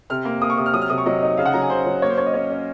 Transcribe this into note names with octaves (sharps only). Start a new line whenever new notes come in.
C3 F6
A#3
A#3 D#6
C#6
C3 D#6
F6
F#3 D#6
F6
C3 D#6
C#6
F#3 D#5
D#4
C#3 F5
F#5
F#3 A#5
G#5
C#3 C5
F#3
A#3 C#5
C5
C#4 C#5
D#5
C#4 C#5
C#4